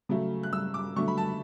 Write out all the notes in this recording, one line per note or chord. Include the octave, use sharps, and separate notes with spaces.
C#3 F#3 A3
F#6
E6
D6
D3 F#3 A3 C#6
B5
A5